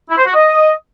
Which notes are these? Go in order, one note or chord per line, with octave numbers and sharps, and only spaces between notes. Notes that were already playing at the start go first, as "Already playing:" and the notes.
E4
C5
F#4
D#5